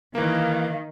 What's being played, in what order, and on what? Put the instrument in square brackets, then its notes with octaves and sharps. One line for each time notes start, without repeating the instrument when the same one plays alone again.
[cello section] D#3 [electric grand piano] E3 A#3 [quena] F5